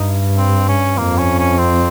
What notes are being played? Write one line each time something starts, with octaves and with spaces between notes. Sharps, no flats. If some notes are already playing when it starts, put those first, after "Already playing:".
Already playing: G2 D#4
C4
C#4
F2 A#3
C#4
C#4
C4